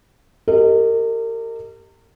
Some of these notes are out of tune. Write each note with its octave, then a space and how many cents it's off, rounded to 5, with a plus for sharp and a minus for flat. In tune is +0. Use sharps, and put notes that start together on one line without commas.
G4 +0 A#4 -35 D#5 +0